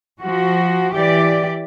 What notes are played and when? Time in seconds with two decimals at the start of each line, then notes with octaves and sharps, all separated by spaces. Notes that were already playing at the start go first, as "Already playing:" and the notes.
0.22 F3 F#4
0.93 E3 G4 D5